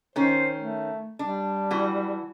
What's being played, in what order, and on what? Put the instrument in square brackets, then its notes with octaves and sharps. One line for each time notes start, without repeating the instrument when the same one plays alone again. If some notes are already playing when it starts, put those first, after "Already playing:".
[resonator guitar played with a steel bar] D#3 C#4 [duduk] C5
[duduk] A3
[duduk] G3 [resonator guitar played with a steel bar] D4
[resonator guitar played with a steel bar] E3 F#4